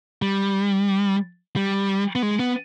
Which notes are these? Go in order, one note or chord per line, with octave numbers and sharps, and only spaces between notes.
G3
G3
B3
G#3
B3